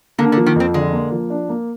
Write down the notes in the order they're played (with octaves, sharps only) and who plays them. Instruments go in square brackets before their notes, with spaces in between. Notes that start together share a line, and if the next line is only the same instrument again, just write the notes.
[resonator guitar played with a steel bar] D3 [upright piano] A#3
[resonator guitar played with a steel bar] D3
[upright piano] F3
[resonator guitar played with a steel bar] D#3
[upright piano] F2 [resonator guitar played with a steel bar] C4
[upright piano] D3 [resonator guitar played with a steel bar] G#3
[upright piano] A#3
F3
D4
A#3